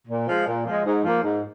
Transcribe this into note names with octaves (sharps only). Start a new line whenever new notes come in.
A#2
F3 G#3
A#2
F3 G#3
G#2
F3 A#3
G#2